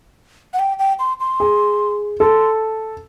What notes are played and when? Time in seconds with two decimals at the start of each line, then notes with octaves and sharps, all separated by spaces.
0.53 F#5
0.59 G5
0.79 G5
0.99 C6
1.20 C6
1.40 G#4
2.20 A4 C6